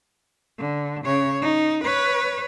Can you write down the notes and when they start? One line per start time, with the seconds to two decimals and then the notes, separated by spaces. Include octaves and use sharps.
0.59 D3
1.05 C#3 C#5
1.42 D#4
1.84 B4 C#5